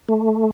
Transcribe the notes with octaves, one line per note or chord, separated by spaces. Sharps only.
A3